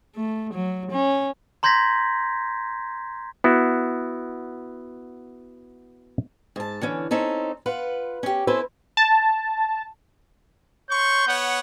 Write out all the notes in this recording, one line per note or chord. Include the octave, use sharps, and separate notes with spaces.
A3
F#3
C#4
A#5 C6 G6 G#6 A#6 B6
B3 E4 F#4
G#2 A5
D3 E3 C#4
C4 C#4 D#4 A4
F4 B4 F#5
C#4 G4
C4 C#4 E4 A4 B4 C5
A5
C#5 C6 C#6 G6
B3 C#5 F#5